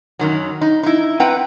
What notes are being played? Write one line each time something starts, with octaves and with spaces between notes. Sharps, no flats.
F#2 D#3 F#3
D#4
D#4 E4
C4 B4 F#5 G5 A#5